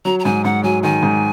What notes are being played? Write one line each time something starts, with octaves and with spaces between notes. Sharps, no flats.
F#3 A#5
A#5
G#2 G#5
G#2 F#5
F#3 G#5
D#3 G#5
G#2